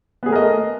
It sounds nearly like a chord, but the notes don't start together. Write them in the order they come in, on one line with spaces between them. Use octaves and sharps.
B3 G#4 A3 A#4 D#5